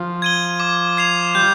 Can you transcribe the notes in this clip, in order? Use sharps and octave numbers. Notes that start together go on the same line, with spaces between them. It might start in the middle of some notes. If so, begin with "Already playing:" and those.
Already playing: F3
G#6 D#7 G7
D6
G#6 C7 F7
G3 G6